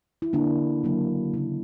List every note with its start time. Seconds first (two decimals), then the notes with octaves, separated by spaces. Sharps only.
0.22 E4
0.33 D3 A#3 D4
0.83 C#3 F#3 A#3
1.34 C#3 F#3 A#3 E4